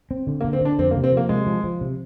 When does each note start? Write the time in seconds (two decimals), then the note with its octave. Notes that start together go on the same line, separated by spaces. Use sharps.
0.11 C4
0.27 D3
0.41 A#3
0.44 D3
0.53 C4
0.61 D3 D4
0.78 F2 C4
0.91 A#3
0.96 C3
1.04 C4
1.12 F3 A#3
1.29 C3 G#3
1.47 F3
1.64 F3
1.81 C3